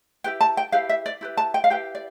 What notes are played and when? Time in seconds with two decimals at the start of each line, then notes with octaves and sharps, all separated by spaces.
0.24 E4 G4 B4 G5
0.41 A5
0.57 G5
0.72 E4 G4 B4 F5
0.89 E5
1.06 D5
1.21 E4 G4 B4
1.37 A5
1.54 G5
1.64 F5
1.70 E4 G4 B4 G5
1.95 D5